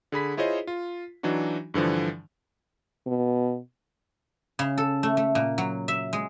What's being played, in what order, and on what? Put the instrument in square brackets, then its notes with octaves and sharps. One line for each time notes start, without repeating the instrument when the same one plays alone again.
[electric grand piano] D3 G#4 B5 B6
E4 F4 G#4 C5 C#5 D#5
F4
E3 F#3 D4 D#4 F#4
G2 D3 E3 F3
[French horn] B2
[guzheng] C#3
A4
A3
A3
A#2
F#3
E5
G#3